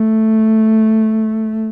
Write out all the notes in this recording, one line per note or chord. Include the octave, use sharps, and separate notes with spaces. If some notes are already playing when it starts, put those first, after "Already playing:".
Already playing: A3